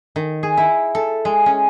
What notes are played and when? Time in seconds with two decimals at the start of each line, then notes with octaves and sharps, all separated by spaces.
0.16 D#3
0.43 G#4
0.57 E4
0.95 A4
1.25 G#3
1.46 C#4